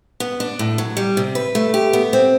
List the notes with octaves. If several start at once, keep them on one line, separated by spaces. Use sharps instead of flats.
B3
D4
A2
F#3
G3
C3
B4
A3
G4
B3
C4